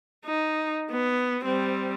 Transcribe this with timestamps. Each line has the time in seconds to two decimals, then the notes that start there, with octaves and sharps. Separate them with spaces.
0.25 D#4
0.90 B3
1.45 G3 C4